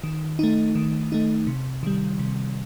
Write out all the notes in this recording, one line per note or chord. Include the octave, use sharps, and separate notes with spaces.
D#3
A3 D#4
D#3
A3 D#4
C3
D#3 G3
C3